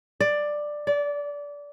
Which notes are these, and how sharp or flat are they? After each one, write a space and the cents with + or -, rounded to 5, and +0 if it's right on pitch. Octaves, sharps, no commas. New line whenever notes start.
D5 +10
D5 -20